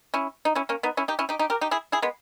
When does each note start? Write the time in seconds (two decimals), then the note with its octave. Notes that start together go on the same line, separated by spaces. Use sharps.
0.14 C#4 E4
0.45 D#4
0.55 C#4 E4
0.69 A#3 C#4
0.83 B3 D#4
0.97 C#4 E4
1.08 D#4 G4
1.19 C#4 E4
1.29 D#4 G4
1.39 D#4 G4
1.50 G4 A#4
1.61 D#4 G4
1.71 E4 G#4
1.92 E4 G#4
2.02 G#3 B3